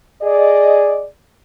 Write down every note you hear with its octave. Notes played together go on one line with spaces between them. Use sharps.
G#4 D5 D#5